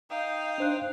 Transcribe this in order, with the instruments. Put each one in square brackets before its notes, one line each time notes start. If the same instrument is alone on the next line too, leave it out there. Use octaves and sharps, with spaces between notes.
[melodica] D#4 G5 D#6 [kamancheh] F5
[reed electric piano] D4 C5 F#6